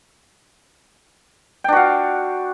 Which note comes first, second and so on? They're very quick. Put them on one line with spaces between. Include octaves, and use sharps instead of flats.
G5 D4 F#4 F5